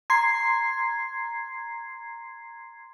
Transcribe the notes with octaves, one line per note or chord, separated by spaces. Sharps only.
A#5 C6 G#6 C7